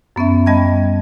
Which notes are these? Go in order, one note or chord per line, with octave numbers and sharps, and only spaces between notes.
F#2 B3 C#4 E5
G3 D#5 G5 A5 B5 G#6